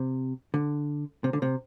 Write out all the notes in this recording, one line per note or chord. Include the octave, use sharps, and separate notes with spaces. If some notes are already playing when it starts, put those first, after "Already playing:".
Already playing: C3
D3
C3
D3
C3